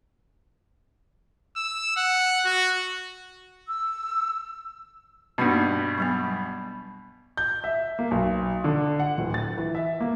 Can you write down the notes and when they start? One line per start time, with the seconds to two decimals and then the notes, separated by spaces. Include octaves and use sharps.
1.57 E6
1.97 F#5
2.45 F#4
3.68 E6
5.38 G2 B2 G3 A#3 D#4
5.98 F#3 G3 B3
7.37 G6
7.64 E5
7.99 A#3
8.11 B1
8.64 D3
9.00 F#5
9.18 D1
9.34 A6
9.58 E3
9.75 E5
10.00 A#3